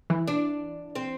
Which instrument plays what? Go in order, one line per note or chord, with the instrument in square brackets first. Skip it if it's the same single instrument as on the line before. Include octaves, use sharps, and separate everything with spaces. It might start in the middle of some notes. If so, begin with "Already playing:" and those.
[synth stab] E3
[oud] D4
C4